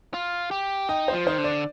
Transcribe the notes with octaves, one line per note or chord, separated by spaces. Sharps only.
F4
G4
D#4 G5
C5
F3
D#3 C5
D3
D5